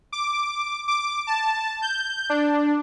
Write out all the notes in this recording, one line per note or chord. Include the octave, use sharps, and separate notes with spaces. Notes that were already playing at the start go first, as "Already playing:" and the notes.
D6
D6
A5
G6
D4